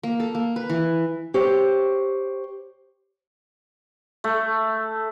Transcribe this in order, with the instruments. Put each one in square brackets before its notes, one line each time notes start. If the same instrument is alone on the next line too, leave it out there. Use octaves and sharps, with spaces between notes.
[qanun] A#3
A4
A#3
B4
E3
[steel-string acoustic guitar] G4 C5 C#5
[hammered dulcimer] A3